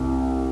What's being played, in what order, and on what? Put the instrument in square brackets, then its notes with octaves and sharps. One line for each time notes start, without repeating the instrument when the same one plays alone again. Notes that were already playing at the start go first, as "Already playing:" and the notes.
Already playing: [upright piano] C2 C3